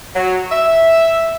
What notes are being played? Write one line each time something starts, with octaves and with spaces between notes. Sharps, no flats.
F#3
E5